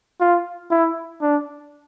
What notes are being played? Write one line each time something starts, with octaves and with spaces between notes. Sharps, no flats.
F4
E4
D4